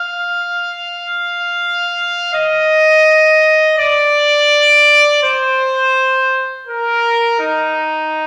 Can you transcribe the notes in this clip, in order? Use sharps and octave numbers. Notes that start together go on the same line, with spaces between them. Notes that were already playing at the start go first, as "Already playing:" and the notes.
Already playing: F5
D#5
D5
C5
A#4
D#4